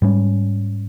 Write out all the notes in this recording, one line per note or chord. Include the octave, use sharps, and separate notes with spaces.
G#2 G3 C#4